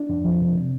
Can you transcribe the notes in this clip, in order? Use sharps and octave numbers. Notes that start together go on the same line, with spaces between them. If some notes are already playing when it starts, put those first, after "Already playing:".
Already playing: D4
F2
F3
C3
C3